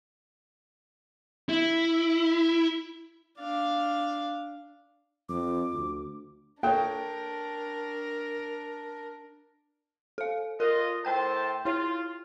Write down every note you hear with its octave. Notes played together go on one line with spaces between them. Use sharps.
E4
D4 F5
F2 D6
D2
A#3 D4 A4 A#4 C#5 G5
A4 F5
F4 A#4 D#5
A2 C5 G5 A5 G6
E4 F4 C#5